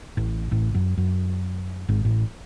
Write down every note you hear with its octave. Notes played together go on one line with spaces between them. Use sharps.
A1 A2
A1 A2
F#2
F#2
G#1 G#2
A1 A2